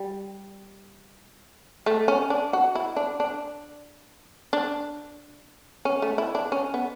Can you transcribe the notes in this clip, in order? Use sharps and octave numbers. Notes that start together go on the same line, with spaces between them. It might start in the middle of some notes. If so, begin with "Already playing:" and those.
Already playing: G3
A3
C#4
D4
F#4
E4
D4
D4
D4
C#4
A3
E4
D4
C#4
B3